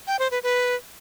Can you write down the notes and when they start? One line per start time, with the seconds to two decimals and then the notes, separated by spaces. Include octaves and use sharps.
0.07 G5
0.19 C5
0.31 B4
0.43 B4